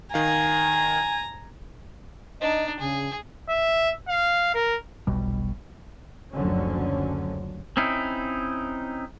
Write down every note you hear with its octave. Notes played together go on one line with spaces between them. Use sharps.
D#3 F5 G#5 A#5
D4 D#4 D#5
C#3 G#4
E5
F5
A#4
F1 B1 B2 G3
F#1 D2 D3 F3 F#3 C#4
C4 C#4 D#4 E4